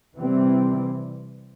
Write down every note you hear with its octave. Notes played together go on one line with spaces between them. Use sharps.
C3 E3 G3 C4